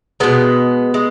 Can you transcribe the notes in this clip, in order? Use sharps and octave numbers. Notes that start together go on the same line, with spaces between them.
B2 G#3 B3
G#3